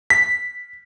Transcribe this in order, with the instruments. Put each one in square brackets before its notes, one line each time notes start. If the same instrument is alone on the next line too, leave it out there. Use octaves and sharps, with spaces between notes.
[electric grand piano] B6